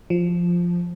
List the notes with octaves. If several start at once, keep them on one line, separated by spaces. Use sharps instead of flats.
F3